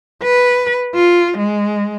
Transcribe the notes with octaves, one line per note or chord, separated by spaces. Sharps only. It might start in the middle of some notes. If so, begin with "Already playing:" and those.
B4
F4
G#3